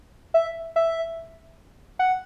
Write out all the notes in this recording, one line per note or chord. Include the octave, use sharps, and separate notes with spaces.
E5
E5
F#5